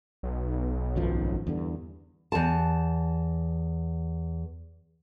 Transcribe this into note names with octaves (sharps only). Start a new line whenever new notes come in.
B1
G#1 F#2 F3
E2 G2 D3
E2 A5